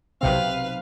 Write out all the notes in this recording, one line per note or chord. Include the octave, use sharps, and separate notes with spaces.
B1 C3 C4 B4 F5